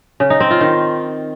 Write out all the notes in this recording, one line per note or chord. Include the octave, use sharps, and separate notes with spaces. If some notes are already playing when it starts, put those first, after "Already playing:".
C#3
D#4
C4
F4
D#3